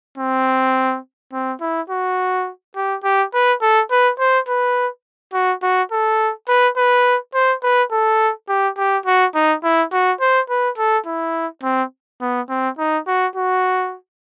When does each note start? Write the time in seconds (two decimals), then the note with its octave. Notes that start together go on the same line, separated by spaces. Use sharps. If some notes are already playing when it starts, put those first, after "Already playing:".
0.18 C4
1.33 C4
1.61 E4
1.90 F#4
2.76 G4
3.04 G4
3.34 B4
3.62 A4
3.91 B4
4.20 C5
4.48 B4
5.33 F#4
5.63 F#4
5.92 A4
6.49 B4
6.77 B4
7.34 C5
7.63 B4
7.92 A4
8.49 G4
8.78 G4
9.06 F#4
9.35 D#4
9.64 E4
9.92 F#4
10.21 C5
10.50 B4
10.78 A4
11.07 E4
11.63 C4
12.21 B3
12.49 C4
12.78 D#4
13.07 F#4
13.36 F#4